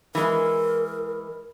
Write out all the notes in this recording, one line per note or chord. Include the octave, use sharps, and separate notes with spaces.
E3 G#3 A#4